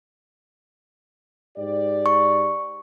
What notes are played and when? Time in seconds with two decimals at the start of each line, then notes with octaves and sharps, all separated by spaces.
1.57 G#2 G4 D5
2.06 C#6